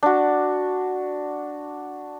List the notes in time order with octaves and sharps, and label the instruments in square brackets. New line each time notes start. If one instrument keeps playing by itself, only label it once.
[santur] D4 F#4